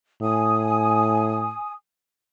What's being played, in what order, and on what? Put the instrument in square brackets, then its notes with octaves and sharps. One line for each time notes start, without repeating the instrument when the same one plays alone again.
[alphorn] A2 [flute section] G#5 D#6